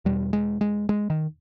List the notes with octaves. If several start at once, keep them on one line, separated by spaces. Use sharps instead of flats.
E2 B2 G3
G#3
G#3
G#3
D#3